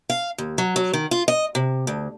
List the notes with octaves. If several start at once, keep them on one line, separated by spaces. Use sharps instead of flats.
F5
D#2
F#3
F#3
D#3
F4
D#5
C3
D2